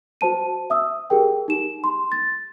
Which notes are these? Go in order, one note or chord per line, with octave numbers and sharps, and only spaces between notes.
F#4 C5 A5 D#7
E5 D#6 E6
G4 G#4 A#4 G5
D#4 G4 E7
C6
A6